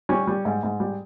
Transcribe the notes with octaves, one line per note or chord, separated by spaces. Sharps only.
G3 C#4
G3
G#2
G#2
G3